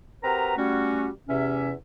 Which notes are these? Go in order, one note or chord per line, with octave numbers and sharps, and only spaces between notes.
C4 F#4 G4 A#4 B4 A#5
G3 A3 C#4 F#4
E2 C3 C#4 E5